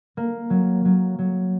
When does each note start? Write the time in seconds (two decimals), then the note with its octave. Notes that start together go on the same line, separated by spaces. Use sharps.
0.17 A#3
0.50 F#3
0.85 F#3
1.19 F#3